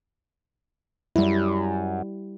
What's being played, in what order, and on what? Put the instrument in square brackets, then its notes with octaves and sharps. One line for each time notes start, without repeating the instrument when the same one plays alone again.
[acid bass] F#2 [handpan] G3 E4